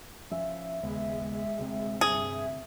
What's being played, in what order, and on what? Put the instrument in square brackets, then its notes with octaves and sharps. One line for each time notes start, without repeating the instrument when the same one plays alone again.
[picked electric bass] F3 C#4 [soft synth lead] E5
[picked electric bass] D#2 C#3 B3 [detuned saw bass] G#3
[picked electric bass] D2 C3 C4
[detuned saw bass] G2 [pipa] G#4